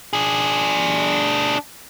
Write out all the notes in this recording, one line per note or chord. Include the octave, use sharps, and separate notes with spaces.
D4 G#4